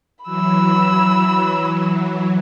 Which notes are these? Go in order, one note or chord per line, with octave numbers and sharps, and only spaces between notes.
E3 F#3 B5 E6